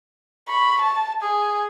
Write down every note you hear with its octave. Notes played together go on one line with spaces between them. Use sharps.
B5 C#6
A5
G#4 G#5